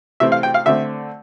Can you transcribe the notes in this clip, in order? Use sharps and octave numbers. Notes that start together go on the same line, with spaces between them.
C3 E3 A3 C4 E5
F5
G5
F5
D3 A3 C4 E5